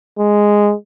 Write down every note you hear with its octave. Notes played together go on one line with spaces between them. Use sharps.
G#3